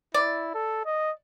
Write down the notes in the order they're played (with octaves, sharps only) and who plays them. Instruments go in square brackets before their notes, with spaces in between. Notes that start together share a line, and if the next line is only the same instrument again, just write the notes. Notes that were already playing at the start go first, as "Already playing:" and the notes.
[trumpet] E4 [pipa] D5
[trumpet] A4
D#5